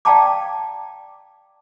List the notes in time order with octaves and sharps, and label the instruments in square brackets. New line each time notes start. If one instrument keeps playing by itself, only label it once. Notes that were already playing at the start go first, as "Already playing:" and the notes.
[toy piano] D5 F5 G5 A5 A#5 D6